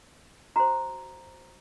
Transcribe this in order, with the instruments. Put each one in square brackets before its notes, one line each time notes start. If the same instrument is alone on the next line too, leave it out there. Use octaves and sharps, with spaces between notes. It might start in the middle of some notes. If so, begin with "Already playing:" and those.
[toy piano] F#4 C5 A#5